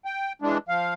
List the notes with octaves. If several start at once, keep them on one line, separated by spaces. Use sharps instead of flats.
G5
E3 G#3 D4
F3 F5